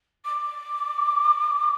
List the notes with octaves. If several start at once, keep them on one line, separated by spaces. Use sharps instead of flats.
D6